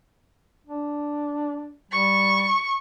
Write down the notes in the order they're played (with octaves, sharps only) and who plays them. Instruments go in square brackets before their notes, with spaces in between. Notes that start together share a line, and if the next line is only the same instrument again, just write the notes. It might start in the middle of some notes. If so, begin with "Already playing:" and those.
[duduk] D4
[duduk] G3 [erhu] C#6